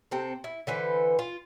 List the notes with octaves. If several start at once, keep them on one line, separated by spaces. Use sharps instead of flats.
C3 C4 A4
E4
D3 E3 B4 C5
F4